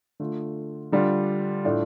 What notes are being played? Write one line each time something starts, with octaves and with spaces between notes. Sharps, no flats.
D3 A3 F4
D3 G3 D4 F4
A2 A3 D4 F4